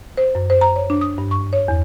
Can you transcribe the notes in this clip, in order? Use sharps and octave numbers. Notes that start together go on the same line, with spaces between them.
C5
F#2
C5
A#5
C#5
D4
D#6
G2
C#6
C#5
E2